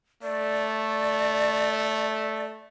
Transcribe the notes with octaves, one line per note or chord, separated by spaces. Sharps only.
A3 D5